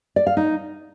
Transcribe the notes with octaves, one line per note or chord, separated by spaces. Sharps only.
D5
F5
D#4